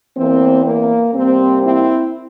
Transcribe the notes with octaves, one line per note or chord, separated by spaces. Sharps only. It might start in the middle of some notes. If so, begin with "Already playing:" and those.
E2 E3 A#3 C4
A#3
C3 G3 A#3 C4
C4 E4